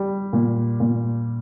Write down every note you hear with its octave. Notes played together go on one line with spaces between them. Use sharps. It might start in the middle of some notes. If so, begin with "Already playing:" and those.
Already playing: G3
A#2
A#2